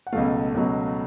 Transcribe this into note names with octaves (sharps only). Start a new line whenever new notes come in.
F#5
C#2 B2 F#3 A3 F5
C#2 B2 F#3 A3